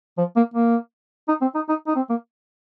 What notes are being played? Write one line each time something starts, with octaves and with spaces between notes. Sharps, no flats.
F3
A#3
A#3
D#4
C4
D#4
D#4
D#4
C4
A#3